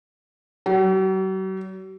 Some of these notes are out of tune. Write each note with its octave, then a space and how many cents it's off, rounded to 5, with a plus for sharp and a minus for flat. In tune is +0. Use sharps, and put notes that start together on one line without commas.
F#3 +45